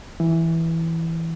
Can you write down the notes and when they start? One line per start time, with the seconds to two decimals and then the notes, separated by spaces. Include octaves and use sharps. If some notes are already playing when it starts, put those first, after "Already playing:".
0.20 E3